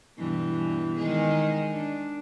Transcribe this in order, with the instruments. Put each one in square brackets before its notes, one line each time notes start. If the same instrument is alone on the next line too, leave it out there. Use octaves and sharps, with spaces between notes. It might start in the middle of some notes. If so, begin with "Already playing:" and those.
[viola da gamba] G2 B2 E3
D#3 G#3 G#4
D4